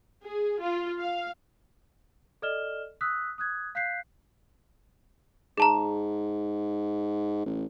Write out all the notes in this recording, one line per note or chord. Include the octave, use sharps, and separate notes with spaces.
G#4
F4
F5
A4 D5 D#5 F6 E7 G7
D#6 E6 F#6 B6
D#6 F#6 G#6
F5 F#6 G6 B6 C7
G#2 G#4 A5 A#5
A1